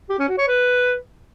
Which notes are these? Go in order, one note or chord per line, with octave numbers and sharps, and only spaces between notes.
G4
C#4
F#4
C#5
B4